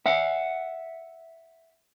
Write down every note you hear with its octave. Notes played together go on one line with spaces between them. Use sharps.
E5 F#5